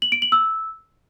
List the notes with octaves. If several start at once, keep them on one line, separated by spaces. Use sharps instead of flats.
F#7
D7
F#7
E6